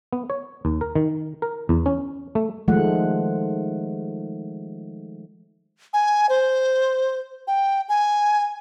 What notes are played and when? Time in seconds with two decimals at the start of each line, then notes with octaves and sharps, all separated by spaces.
0.13 B3
0.30 C#5
0.65 D#2
0.81 A#4
0.96 D#3
1.42 A#4
1.69 E2
1.86 C#4
2.35 A3
2.68 D#3 F3 G#3 A3 F#5
5.93 G#5
6.29 C5
7.47 G5
7.89 G#5